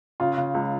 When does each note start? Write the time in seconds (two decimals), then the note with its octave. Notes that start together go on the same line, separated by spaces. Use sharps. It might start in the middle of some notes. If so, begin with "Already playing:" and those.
0.20 C#3 F4
0.38 C#3
0.54 C#2